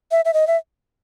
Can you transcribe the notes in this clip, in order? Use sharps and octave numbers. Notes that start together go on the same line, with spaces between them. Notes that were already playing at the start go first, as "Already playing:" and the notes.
E5
E5
D#5
E5